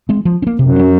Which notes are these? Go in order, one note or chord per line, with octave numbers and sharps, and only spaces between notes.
G#3 C4
F3
C#4
A#3
F#2 C3
F#3 C#4